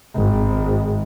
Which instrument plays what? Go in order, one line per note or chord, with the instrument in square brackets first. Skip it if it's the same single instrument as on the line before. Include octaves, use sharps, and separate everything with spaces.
[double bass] G#1